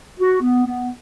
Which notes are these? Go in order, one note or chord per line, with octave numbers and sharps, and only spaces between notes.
F#4
B3
B3